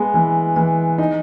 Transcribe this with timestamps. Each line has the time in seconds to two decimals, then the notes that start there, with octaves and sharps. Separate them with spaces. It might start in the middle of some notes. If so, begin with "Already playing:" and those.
Already playing: G#3 B3
0.14 E3
0.56 E3
0.98 D#4